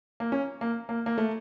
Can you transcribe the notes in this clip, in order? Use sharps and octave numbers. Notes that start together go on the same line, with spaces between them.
A#3
C#4
A#3
A#3
A#3
A3